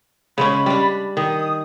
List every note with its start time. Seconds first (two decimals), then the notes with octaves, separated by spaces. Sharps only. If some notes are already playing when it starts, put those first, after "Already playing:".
0.38 C#3 G#3 C#4 B5
0.66 G3 D4
1.17 D#3 D#6